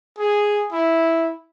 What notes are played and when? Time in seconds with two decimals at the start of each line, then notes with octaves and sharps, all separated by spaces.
0.18 G#4
0.72 E4